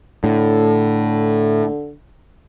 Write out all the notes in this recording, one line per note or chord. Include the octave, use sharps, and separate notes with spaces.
A2 D3